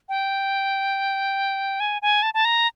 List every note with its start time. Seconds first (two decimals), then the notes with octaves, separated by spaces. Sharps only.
0.09 G5
1.80 G#5
2.02 G#5
2.23 A5
2.34 A5
2.45 A#5